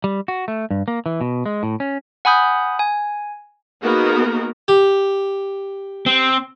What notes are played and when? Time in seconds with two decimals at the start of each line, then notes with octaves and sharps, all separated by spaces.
0.04 G3
0.28 F#4
0.48 A3
0.71 G2
0.88 A#3
1.06 E3
1.21 B2
1.46 G#3
1.63 A2
1.80 C#4
2.25 F#5 G#5 B5 D#6 G6
2.79 G#5
3.82 A#3 B3 D#4 F#4 G#4 A#4
4.68 G4
6.06 C4